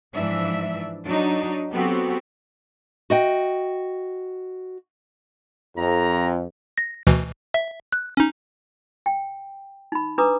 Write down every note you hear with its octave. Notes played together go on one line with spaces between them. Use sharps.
G#2 E3 F3 D4 E5
F#3 D4 D#4
F#3 B3 C4 F#4 G4 A4
F#4 D#5 G5
F2 A#5
A#6
D2 B2 E3
E5
F#6
C#4 D#4
G5
D#4 B5
D4 B4 A#5 D6 D#6